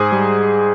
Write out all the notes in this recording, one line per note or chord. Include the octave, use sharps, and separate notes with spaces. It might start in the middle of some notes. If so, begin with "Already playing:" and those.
Already playing: G#2 G#4 C5
G3